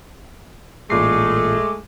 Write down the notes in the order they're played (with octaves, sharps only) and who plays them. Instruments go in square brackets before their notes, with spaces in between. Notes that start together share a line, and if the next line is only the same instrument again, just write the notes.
[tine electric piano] A1 A#2 C7 [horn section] G#3 A3 [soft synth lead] D6